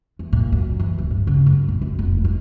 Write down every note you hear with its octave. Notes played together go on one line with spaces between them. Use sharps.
E2
A#2
F#2
E3
D1
G2
C#3
F#2
A#1
F#2
F1
D#4